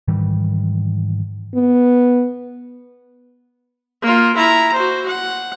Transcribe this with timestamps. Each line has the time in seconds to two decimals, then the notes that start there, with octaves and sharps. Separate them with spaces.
0.08 G#2 D#3 E3 G3
1.55 B3
4.02 A#3 F4
4.36 E4 A#5
4.73 F#4 C5
5.08 F#5